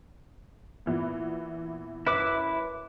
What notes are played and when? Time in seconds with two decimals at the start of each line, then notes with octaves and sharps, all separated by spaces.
0.86 A#2 E3 B3
2.07 F#2 E4 B4 D6